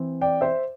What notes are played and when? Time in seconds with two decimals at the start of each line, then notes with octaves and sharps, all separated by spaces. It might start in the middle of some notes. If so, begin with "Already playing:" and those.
Already playing: E3 C4
0.21 D5 G5
0.41 C5 E5